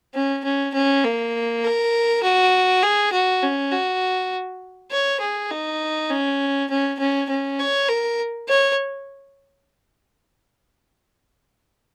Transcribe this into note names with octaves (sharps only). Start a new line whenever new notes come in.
C#4
C#4
C#4
A#3
A#4
F#4
G#4
F#4
C#4
F#4
C#5
G#4
D#4
C#4
C#4
C#4
C#4
C#5
A#4
C#5